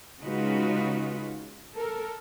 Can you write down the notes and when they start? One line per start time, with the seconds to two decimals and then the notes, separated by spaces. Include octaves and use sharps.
0.21 C#3 G#3 D#4 F4 F#4 B4
1.76 A4 A#4